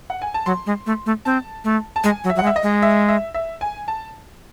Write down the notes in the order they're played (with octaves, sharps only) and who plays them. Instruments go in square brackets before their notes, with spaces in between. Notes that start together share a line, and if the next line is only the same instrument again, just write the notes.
[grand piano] F#5
G#5
A5
[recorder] F#3 [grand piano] C6
[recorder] G#3
A3
A3
[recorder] C4 [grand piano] A5
[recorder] A3
[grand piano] A5
[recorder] G#3 [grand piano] G#5
[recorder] F#3
[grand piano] E5
[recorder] F#3
[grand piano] F#5
[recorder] G#3
[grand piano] E5
D#5
[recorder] G#3
[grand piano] E5
E5
E5
G#5
A5